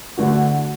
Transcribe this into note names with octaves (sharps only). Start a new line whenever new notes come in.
D3 A3 F#4